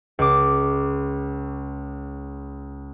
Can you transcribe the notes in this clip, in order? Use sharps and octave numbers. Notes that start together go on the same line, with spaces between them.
C#2 D6